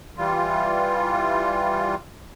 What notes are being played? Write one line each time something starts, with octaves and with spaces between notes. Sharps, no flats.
E3 G3 F4